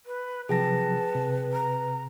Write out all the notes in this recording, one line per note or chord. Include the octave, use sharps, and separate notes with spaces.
B4
C3 F3 F#3 G#4 B4 G5 A5 A#6
C3
A#5